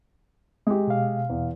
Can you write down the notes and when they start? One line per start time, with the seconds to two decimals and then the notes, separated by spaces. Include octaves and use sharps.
0.67 G#3 G4
0.87 B2 F5
1.30 E2